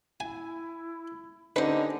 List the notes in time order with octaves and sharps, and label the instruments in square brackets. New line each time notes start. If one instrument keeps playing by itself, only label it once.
[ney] E4 [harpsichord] G#5
[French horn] D3 [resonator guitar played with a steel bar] C#4 D#4 [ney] G4 [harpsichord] B4 C5